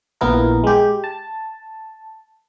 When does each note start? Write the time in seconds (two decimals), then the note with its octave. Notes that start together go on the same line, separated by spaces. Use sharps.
0.21 A#1 B3 E4 A#4
0.64 G#3 G4
1.04 A5